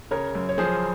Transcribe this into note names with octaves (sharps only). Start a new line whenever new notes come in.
C#3 A#4 C#5
F#2
C#5
F3 G#4 C5